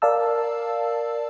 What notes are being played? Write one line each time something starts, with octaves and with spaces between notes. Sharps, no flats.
A#4 D5 F5 A5 E6